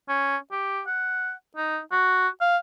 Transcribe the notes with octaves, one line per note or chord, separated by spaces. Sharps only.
C#4
G4
F#5
D#4
F#4
F5